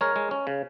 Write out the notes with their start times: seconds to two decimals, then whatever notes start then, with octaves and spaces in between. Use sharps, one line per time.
0.01 G#3 A#4 C#5
0.16 G#3
0.31 C#4
0.47 C#3